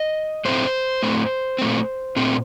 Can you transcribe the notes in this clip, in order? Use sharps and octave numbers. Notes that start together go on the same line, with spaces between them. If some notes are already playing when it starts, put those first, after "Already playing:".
Already playing: D#5
A2 A3 C4 C5
A2 A3 C4
A#2 A3 C4
A#2 A3 C4